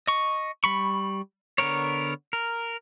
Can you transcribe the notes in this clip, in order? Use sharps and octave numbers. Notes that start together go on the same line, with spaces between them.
D#5 C#6
G3 B5 C#6
D3 B3 A#4 C#5
A#4